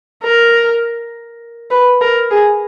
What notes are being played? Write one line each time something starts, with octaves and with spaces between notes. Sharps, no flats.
A#4
B4
A#4
G#4